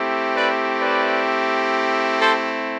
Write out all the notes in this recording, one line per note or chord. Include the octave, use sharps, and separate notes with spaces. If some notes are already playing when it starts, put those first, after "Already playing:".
Already playing: A3 C4 E4 G4
B4 D5
B4 D5
A4 C5